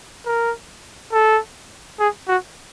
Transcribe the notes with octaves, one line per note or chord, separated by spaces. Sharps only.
A#4
A4
G#4
F#4